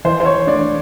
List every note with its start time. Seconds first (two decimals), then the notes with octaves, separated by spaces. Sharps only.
0.05 E3 C5
0.20 C5
0.26 C#5
0.47 A3 D4 D5